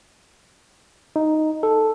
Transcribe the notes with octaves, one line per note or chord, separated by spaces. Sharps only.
D#4
A4